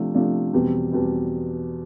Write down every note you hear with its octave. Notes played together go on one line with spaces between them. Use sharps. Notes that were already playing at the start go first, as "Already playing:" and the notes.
Already playing: C3 F3 A3 D4
C3 F3 A3 D4
E2 B2 G3 C4
E2 B2 G3 C4